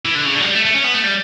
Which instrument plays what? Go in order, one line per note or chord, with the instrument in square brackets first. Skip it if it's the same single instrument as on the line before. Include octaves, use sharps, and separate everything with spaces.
[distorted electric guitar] E3
D3
C#3
D3
F#3
G3
A3
A3
C#4
B3
A3
G3